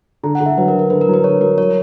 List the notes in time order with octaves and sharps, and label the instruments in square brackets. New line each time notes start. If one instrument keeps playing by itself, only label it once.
[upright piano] D3 [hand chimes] A#5
[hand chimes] F#5
[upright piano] D3
[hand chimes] E5
[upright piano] F#3 [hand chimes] B4
[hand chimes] A#4
[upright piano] D3
[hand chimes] A#4
[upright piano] D3 [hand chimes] B4
[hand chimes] A#4
[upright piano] F#3
[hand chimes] B4
[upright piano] D3 [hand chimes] C#5
[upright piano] F#3 [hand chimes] A#4
[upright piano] F#3 [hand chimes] C#5